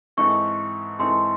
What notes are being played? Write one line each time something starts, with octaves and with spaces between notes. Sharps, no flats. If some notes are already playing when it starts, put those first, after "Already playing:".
G#2 E3 C4 D#4 A4 C#6
G#2 E3 C4 D#4 A4 C6